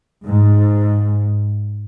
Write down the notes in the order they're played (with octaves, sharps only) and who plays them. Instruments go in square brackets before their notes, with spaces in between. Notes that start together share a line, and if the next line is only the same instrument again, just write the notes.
[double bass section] G#2